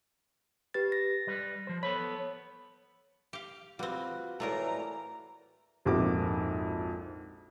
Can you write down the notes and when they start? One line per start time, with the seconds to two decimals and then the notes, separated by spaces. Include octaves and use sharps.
0.74 G4 B4 A6
0.92 A#6
1.27 G3 B4
1.67 F3 C5
1.83 B3 A4 C#5 B5
3.33 G4 F5
3.79 G3 C4 F4 F#4 B4
4.40 A2 E3 A3 F4 A#4 D5 F5 A#5
5.85 A#1 F2 G#2 A#3 F#4 D6